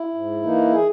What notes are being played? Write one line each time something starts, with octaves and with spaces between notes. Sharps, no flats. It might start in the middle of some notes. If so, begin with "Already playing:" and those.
Already playing: E4
G#2
E3 A#3 D#4
G#4